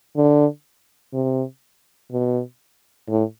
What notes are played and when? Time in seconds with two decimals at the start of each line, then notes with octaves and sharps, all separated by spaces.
0.16 D3
1.13 C3
2.11 B2
3.08 A2